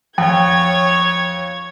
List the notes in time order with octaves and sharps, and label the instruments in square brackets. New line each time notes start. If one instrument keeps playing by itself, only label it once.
[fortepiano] F2 G5 [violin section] C#5 G#6